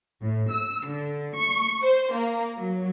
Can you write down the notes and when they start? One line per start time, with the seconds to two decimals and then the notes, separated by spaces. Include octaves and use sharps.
0.22 A2
0.51 E6
0.86 D3
1.37 C#6
1.82 C5
2.13 A#3
2.58 F#3